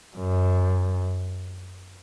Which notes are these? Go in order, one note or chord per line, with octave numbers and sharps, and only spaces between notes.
F#2